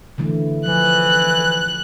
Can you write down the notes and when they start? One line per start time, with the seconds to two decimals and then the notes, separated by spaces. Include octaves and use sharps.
0.18 D3 E3 A3
0.66 E3 F3 F#6